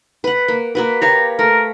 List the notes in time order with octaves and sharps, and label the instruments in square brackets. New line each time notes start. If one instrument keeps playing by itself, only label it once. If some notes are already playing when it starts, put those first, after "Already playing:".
[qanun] B4 F#5
A#3
A#3 F#4 B4
[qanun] G4 C#5 F5 [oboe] A#5
[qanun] A3 [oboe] A#4